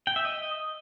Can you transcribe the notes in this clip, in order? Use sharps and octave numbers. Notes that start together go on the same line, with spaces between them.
G5
E5
D#5